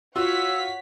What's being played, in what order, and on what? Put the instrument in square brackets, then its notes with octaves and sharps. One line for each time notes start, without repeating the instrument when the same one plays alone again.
[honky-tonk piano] F4 F#4 F5 [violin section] C#5 F#5 B6 [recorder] E6